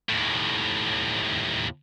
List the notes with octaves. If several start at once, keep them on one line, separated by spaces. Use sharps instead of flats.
D#2 A2